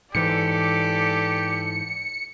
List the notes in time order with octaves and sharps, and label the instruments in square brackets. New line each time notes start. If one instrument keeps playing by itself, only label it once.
[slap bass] G#2 E3 [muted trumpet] G4 [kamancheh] A4 D5 [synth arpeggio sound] C#7